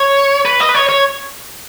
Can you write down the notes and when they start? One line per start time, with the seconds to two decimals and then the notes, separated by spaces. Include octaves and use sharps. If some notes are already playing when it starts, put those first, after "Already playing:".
Already playing: C#5
0.45 B4
0.60 D#5
0.69 B4
0.75 C#5
0.89 C#5